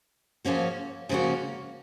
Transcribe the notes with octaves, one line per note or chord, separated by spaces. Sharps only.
C#3 F3 A#3 C#4 F#4
C#3 F3 A#3 C#4 F#4